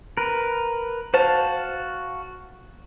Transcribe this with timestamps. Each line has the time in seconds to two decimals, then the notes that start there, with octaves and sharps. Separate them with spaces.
0.17 A#4 B4
1.14 F#4 C5 F5 A5